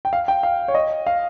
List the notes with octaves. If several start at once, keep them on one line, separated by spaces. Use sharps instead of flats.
G5
F5
G5
F5
C#5
D#5
F5